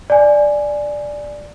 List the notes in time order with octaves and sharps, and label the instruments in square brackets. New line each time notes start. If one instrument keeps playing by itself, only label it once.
[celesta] D5 G#5